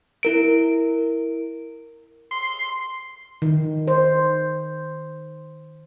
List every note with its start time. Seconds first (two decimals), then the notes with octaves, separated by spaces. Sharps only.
0.23 E4 A#4 D7
2.31 C6
3.42 D#3
3.88 C5